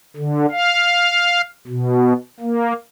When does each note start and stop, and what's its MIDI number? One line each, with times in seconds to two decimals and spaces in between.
0.17 0.46 50
0.51 1.41 77
1.67 2.13 47
2.40 2.73 58